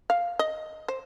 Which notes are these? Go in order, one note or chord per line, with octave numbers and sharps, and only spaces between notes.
F5
D#5
C5